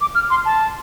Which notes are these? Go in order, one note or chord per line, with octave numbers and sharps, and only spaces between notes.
D6
F6
C6
A5